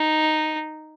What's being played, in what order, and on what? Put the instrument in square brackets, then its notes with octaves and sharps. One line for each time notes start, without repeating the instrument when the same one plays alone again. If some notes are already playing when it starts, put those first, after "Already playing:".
Already playing: [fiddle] D#4